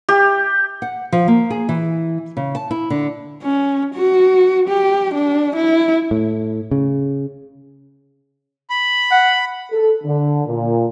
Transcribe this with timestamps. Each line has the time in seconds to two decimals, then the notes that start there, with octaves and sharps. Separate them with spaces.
0.09 G4
0.82 F#5
1.12 F3
1.28 A#3
1.50 G#4
1.69 E3
2.37 C#3
2.55 A5
2.71 E4
2.90 D3
3.43 C#4
3.95 F#4
4.69 G4
5.15 D4
5.56 E4
6.11 A2
6.71 C#3
8.70 B5
9.11 F#5
9.72 A4
10.04 D3
10.47 A#2